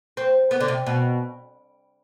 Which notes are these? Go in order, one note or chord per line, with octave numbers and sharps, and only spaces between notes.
C4
B3
D3
C3
B2